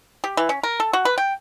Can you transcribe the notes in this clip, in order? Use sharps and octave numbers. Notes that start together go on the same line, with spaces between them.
G4
E3
C#4
A#4
A4
F#4
B4
G5